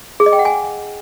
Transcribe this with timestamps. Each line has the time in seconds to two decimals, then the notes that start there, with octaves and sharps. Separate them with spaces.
0.20 G#4
0.26 D#5
0.33 G5
0.39 F#5
0.45 G#5